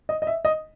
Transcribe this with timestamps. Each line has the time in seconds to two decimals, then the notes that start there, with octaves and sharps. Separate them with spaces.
0.09 D#5
0.22 D#5
0.27 E5
0.45 D#5